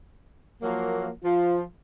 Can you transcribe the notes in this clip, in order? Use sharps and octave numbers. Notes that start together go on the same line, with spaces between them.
F3 F#3 A#3
F3 F4